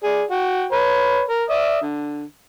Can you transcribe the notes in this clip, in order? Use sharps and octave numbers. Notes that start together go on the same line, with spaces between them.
G#4 D5
F#4 G5
B4 C#5 B5
A#4
D5 E5 D#6
D3